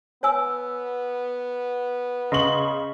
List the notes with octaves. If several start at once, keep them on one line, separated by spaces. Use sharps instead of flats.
B3 C#5 G#5 E6
C#3 D#5 C6 C#6 F#7